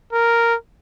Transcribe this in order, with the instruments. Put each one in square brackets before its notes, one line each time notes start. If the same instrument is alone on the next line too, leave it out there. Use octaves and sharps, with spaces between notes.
[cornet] A#4